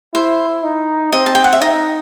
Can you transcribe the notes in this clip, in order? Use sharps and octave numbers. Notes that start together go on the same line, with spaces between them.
E4 C5
D#4
C4 D#5
A5
G5
F#5
E5
D#4 D#5